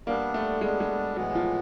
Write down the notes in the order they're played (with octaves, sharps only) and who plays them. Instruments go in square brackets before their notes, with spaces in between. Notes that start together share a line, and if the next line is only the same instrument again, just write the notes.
[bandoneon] G3 B3 D4 [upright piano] A#3
[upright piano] A3
[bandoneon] G3 B3 D4 [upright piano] G#3
[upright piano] G#3
[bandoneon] A2 E3 G#3 B3 [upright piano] F#3
[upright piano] F3